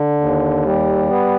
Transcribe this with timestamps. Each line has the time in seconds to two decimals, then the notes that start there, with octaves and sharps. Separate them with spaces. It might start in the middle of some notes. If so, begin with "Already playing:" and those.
Already playing: D3
0.20 D#2
0.65 G3
1.09 B3